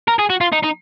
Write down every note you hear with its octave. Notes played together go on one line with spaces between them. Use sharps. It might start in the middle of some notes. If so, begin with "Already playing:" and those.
A#4
G#4
F#4
F4
D#4
D#4